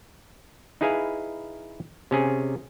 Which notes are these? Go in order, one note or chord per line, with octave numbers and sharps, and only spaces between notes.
D#4 E4 G#4 B4 F5 G#5
C3 C#4 G#4